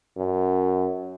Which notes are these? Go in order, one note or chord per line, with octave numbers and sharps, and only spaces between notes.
F#2